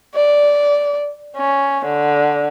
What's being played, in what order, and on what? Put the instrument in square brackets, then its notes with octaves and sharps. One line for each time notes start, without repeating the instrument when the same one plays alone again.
[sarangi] D5
C#4
D3